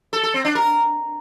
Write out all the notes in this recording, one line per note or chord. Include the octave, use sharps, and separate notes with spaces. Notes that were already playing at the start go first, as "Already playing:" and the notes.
A4
A4
C4
D4
A#4